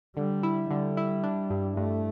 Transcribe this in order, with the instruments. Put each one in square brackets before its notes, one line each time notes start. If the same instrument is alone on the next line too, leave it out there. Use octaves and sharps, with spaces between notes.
[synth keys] D3 [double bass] G3
[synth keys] E4
[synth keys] D3 [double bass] G3
[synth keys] E4
D4
G2
[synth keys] G2 [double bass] A3